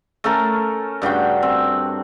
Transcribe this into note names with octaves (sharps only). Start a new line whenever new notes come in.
A3 C#4 A4 A#4
G2 C#3 F#4 G5
C4